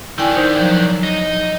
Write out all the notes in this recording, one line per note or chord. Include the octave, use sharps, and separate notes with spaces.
D#3 D4 E4 G5 G#5
D#4 C5
F3 F#3
D#4